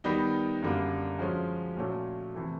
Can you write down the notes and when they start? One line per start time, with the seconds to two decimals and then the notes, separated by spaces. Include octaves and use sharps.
0.04 D#3 G3 B3 D#4
0.62 F#2 D3 G3 A#3
1.19 F3 G#3 C#4 F#4
1.77 A#2 F#3 A3 C#4
2.35 C3 E3 A3